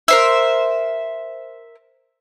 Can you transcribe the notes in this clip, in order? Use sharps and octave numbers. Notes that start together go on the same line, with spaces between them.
A#4 C5 E5